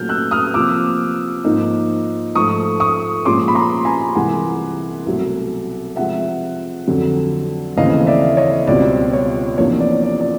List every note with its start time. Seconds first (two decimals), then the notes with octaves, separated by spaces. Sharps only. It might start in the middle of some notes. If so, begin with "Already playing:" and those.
Already playing: A#2 F#3 A3 F6 G6
0.09 E6 F#6
0.31 D#6 F6
0.54 C3 F3 A#3 D6 E6
1.44 G#2 F3 A#3 D#4
2.35 G#2 F3 A3 C#6 D#6
2.80 C#6 D#6
3.25 A#2 F3 G#3 C#4 C6 D6
3.48 B5
3.55 A#5 C6
3.85 G#5 A#5
4.15 C2 C3 E3 G#3 F#5 G#5
5.06 C2 B2 F#3 A3
5.96 C3 F3 G#3 E5 F#5
6.87 F2 D3 F#3
7.77 D#2 C#3 E3 A3 C4 D#5 F5
8.07 D5 E5
8.37 C#5 D#5
8.67 C#2 B2 G3 C4 D5
9.13 C#5
9.58 E2 C3 F3 A#3 D4 C#5
9.80 D5
10.03 D5
10.21 D5